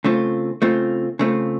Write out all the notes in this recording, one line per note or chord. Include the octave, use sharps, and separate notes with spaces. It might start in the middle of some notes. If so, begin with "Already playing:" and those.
C#3 A3 C4 F4
C#3 A3 C4 F4
C#3 A3 C4 F4